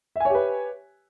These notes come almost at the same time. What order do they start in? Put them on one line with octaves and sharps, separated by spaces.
E5 G#5 C#5 G4 B4